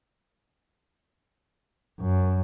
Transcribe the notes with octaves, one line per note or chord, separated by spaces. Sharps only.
F#2